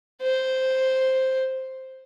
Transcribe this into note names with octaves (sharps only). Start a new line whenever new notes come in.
C5